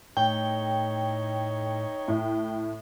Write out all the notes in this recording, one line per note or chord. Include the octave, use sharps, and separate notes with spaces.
A2 D#4 C#5 G5
A2